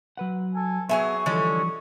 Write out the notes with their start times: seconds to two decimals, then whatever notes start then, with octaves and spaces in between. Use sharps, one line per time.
0.17 F#3 B4 F#5
0.53 A4 G#5
0.89 F#3 B3 G#4 E5 C#6
1.26 D3 E3 F3 G3 G#3 C#4